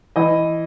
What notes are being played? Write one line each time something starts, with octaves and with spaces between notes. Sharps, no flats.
E3 D#5